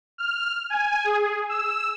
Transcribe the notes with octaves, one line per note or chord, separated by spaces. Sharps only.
F6
G#5
G#4
E6